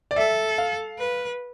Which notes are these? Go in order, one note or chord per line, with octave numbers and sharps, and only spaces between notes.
D5
A4 E5
F5
B4